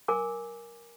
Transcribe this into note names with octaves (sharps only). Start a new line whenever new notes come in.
A#4 G#5 D6